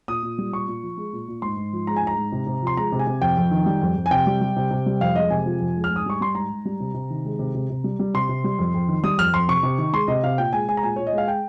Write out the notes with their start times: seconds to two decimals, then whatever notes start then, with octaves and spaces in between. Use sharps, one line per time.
0.08 A#2 D#6
0.23 A#2
0.38 G3
0.52 A#2 C#6
0.68 A#2
0.83 F3
0.97 G#3
1.13 A#2
1.28 A#2
1.42 G#2 C6
1.57 G#2
1.73 F3
1.87 G#3 A#5
1.96 G#5
2.02 G#2 A#5
2.17 G#2
2.32 C3
2.47 C3
2.62 F3 C6
2.77 G#3 A#5
2.92 C3
2.99 G#5
3.07 C3
3.22 F2 G5
3.37 F2
3.51 D#3
3.66 G3
3.82 F2
3.96 F2
4.06 G#5
4.11 C3 G5
4.27 G3
4.41 G3
4.56 C3
4.71 C3
4.86 G3
5.01 F2 F5
5.16 G#3 D#5
5.30 C3 G#5
5.46 F3
5.60 F2
5.76 G#3
5.84 F6
5.91 G#2 D#6
6.06 G3 C#6
6.21 G3 C6
6.35 G#2 A#5
6.50 G#2
6.65 G3
6.80 C3
6.94 C3
7.10 D#3
7.25 G#3
7.39 C3
7.55 C3
7.70 C3
7.84 G3
7.99 G3
8.14 C3 C6
8.29 C3
8.44 G3
8.59 F2
8.74 F2
8.88 D#3
9.03 G3 D#6
9.18 F2 F6
9.34 F2 C6
9.48 C3 C#6
9.63 C3
9.78 D#3
9.93 G#3 C6
10.08 C3 D#5
10.23 C3 F5
10.38 A#2 G5
10.53 G#3 G#5
10.68 G#3 G#5
10.77 A#5
10.83 A#2 G#5
10.96 A#2 C#5
11.07 D#5
11.13 G#3
11.18 F5
11.28 G5